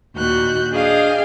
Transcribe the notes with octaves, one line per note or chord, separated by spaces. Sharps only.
D#2 A#2 F#4 F#6 G6
D4 G#4 D#5 F5 G5